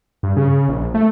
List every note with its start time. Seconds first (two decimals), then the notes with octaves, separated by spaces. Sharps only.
0.23 G2
0.37 C#3
0.69 A#1
0.94 A3